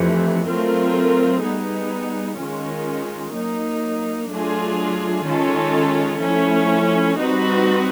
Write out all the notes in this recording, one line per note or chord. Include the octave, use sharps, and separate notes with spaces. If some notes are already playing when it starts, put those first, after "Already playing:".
Already playing: F2 C3 E3 A3
F#3 A3 C4 F4 A#4
G3 B3 D#4 G#4
D#3 G#3 C#4 F4 A#4
F#3 A#3 D#4
F#3 A3 D4 F4 G#4
D#3 G#3 C#4 F4 A4
F3 A3 C#4 E4
G3 C4 D#4 F#4 B4